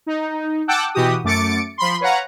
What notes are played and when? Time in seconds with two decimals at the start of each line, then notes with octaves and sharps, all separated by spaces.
0.06 D#4
0.68 F#5 G5 A5 D6 E6 F#6
0.94 B2 E3 F#4 G4 D#6
1.24 F#2 A3 D6 A6 C#7 D7
1.78 F3 B5 C6
2.01 B4 C#5 F5 F#5 A#5